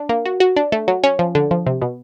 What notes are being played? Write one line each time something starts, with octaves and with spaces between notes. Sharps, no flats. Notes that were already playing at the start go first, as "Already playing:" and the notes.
Already playing: D4
A#3
F#4
F#4
D4
A3
F#3
C#4
F3
D3
F3
C3
B2